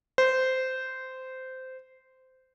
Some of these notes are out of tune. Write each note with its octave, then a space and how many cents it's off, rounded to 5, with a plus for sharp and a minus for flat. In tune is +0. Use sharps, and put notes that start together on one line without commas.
C5 -15